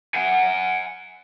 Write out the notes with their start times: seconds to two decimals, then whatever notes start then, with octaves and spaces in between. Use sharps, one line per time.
0.15 F#5 G#5